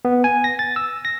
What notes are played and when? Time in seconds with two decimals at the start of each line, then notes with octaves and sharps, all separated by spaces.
0.05 B3
0.24 G#5
0.44 A#6
0.59 A6
0.76 E6
1.05 A#6